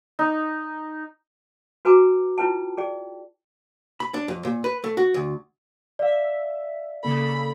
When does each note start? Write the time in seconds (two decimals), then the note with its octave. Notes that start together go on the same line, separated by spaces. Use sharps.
0.19 D#4
1.85 F#4 B4 G#5 A#5 D6
2.38 E4 F4 B4 G5 A5
2.77 G#4 D5 G5
4.00 B5
4.14 D4
4.28 F2
4.45 A#2
4.64 B4
4.84 A3
4.97 F#4
5.14 D2
5.99 D5 E5 F5
7.03 C#3 A#3 A4 B5